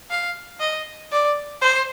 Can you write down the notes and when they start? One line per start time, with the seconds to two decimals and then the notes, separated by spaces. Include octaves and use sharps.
0.10 F5
0.60 D#5
1.12 D5
1.62 C5